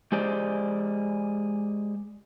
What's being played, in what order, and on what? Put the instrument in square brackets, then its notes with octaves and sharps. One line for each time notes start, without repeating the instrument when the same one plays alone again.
[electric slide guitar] G#3 G4 G#4 C5 D5